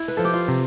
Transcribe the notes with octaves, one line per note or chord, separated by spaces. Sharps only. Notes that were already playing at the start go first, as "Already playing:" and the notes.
Already playing: E4
B4
F3 A4
G4
F4
C3